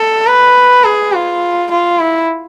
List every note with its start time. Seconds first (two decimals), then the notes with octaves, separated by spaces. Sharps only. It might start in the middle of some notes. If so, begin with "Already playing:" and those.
Already playing: A4
0.27 B4
0.84 G#4
1.13 F4
1.71 F4
2.00 E4